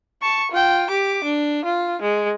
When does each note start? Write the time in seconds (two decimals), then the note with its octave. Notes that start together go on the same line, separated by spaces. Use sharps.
0.22 A5 C#6
0.51 F4 G5
0.90 G4 D6
1.24 D4
1.65 F4
2.02 G#3